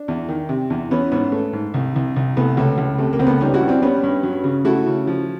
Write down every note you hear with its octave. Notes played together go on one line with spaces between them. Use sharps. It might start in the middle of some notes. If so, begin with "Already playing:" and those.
Already playing: D4
E2
D#3
C3
E2
E3 B3 C#4
G#2 B3 C#4
A3
G#2
C2
C2
C2
C2 A3 B3
C#2 A3
C#2
C3 A3
A#3
C#2 C4
A3 B3
G3 C#4 D#4
E4 F#4
G2
C4 D4
G3 B3 C#4
G2
F#3
C#3
A3 E4 F#4
C#3
F3